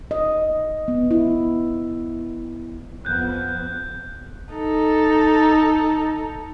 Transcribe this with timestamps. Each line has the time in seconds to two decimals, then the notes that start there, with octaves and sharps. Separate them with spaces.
0.11 D#5
0.88 B3
1.11 E4
3.05 F2 F3 B3 F#6 G6
4.54 D#4 A4